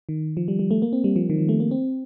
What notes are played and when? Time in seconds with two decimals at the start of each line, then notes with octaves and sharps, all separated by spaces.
0.09 D#3
0.37 F3
0.48 G3
0.59 G3
0.71 A3
0.82 A#3
0.93 C4
1.04 G3
1.16 F3
1.30 D#3
1.38 F3
1.49 A3
1.60 A#3
1.71 C4